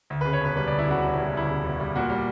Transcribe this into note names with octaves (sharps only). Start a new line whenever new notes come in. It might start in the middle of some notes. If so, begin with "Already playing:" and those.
D2
B4
C#3
C#5
E1 B4
G3 B4
D5
D2
E4
C#3 F#4
E1 F#4
E4
G3
F#4
D2 E4
C#3
E1
G3
A#2 F#4
G3